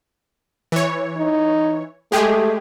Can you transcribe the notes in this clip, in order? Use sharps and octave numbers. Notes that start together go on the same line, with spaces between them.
E3 C#5
D#4
G#3 A3 G4 G#4